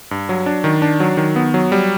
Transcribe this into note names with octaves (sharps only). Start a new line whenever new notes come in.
G2
F#3
D4
D#3
D4
F#3
D#3
B3
F#3
G3